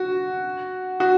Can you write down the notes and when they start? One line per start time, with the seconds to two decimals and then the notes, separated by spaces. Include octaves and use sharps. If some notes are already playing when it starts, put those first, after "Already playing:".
Already playing: F#4
1.00 F#4